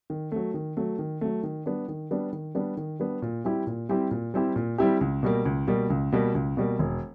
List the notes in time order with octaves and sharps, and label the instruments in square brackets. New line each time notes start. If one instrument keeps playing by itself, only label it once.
[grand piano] D#3
F#3 A3
D#3
F#3 A3
D#3
F#3 A3
D#3
G3 B3 D4
D#3
G3 B3 D4
D#3
G3 B3 D4
D#3
G3 B3 D4
A#2
G3 C4 E4 G4
A#2
G3 C4 E4 G4
A#2
G3 C4 E4 G4
A#2
G3 C4 E4 G4
C#2
B2 G3 A#3
C#2
B2 G3 A#3
C#2
B2 G3 A#3
C#2
B2 G3 A#3
E1